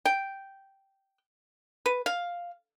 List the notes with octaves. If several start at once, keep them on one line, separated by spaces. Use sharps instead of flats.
G5
B4
F5